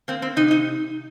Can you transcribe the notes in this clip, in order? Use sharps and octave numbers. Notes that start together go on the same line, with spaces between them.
A#3 C4
C4
C3 D#4
D#4